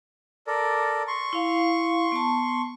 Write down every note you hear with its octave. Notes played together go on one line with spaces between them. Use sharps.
A4 A#4 D5
C6 C#6
E4 F5
B3 A5